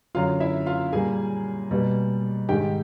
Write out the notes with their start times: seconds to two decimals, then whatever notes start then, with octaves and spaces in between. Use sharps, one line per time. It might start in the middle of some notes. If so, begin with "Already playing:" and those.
0.15 F#2 D3 F#3 F4 F5
0.40 E4 E5
0.66 F4 F5
0.93 A#2 G3 A#3 G#4 G#5
1.71 B2 G3 A#3
2.49 G#2 D#3 G#3 G4 G5